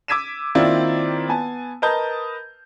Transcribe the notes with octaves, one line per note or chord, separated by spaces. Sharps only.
D6 E6 G#6 B6 D#7 E7
D#3 A#3 C4 E4 F4 D5
B3 G#5 A5
A#4 B4 D#5 A5 D#6 G6